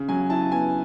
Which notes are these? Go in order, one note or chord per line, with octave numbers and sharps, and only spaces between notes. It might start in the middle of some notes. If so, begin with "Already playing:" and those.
Already playing: C#3
F#3 G#5
E4 A5
B3 G#5